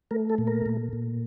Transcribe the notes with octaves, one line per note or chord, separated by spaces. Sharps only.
A3 A#4
A4
A#2
A#4
A#2
A#2